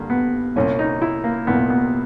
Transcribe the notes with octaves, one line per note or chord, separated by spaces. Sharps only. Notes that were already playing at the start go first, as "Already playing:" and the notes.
Already playing: G2 D3 A#3
B3
C2 A#2 C#4
D#4
E4
A#3
C2 A#2 B3
B3